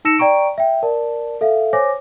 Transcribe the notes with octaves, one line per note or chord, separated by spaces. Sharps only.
D#4 A5 E6 A#6 C#7 E7
D5 G5 A#5 C#6 D7
E5 G5
A#4 D5 A5
A4 E5 F5
C5 C#5 G#5 D6 A#6